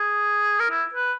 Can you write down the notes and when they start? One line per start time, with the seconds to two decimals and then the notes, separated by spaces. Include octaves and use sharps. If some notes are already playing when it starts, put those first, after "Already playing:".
Already playing: G#4
0.60 A#4
0.71 E4
0.95 B4